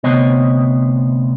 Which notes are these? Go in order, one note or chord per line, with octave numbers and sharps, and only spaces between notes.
D2 C3 B3 C5 C#5 D#5